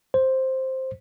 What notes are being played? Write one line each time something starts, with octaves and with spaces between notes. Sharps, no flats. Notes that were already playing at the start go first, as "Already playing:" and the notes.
C5